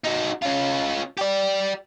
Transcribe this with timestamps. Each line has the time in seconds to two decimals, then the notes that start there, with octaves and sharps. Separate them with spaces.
0.05 D#4 F#4
0.43 C#4 F4
1.17 G4 D5